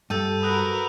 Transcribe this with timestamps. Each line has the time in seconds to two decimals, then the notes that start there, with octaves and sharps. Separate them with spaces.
0.10 G2 A4 E6 G6 D#7
0.43 F#4 A#4 B4 D#6 F#6